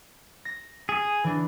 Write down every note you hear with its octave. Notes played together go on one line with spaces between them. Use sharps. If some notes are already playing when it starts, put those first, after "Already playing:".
A#6
G#4
E3 D4